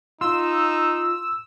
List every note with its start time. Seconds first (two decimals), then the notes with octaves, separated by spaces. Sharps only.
0.21 D#4 F4 C6 E6